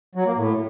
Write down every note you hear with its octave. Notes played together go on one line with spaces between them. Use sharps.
F#3
A#3
A2